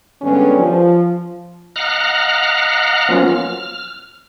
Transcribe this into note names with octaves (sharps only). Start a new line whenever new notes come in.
G2 D3 G#3 B3 C#4
F3
D#5 F5 F#5 A#5 F6 F#6
F3 F#3 A#3 B3 C#4 F4
F6